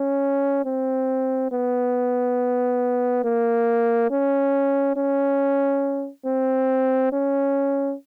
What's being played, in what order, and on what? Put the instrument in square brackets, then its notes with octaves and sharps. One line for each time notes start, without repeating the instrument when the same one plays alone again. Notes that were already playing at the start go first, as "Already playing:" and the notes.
Already playing: [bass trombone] C#4
C4
B3
A#3
C#4
C#4
C4
C#4